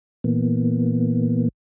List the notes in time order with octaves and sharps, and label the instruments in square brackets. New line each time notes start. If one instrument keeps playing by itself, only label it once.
[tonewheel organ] A#2 E3 A#3 B3